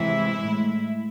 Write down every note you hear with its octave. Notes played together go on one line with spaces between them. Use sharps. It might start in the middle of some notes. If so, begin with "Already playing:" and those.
Already playing: C3 E3 G#3 E4
A2 G#3